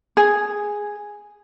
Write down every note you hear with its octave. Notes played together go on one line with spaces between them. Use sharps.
G#4